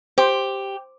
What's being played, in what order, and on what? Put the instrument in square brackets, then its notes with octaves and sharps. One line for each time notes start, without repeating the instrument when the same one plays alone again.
[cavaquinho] G4 [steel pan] C5